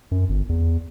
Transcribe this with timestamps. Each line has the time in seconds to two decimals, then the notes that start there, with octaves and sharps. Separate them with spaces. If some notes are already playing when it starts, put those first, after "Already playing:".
0.11 F#2
0.29 G1
0.49 E2